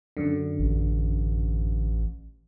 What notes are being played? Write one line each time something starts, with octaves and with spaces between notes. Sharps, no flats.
F#2 D3
A1